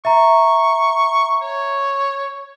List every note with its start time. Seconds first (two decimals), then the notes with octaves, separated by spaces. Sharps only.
0.05 E5 A#5 C#6
1.42 C#5